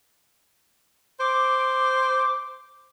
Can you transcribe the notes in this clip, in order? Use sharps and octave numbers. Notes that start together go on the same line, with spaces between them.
C5 D6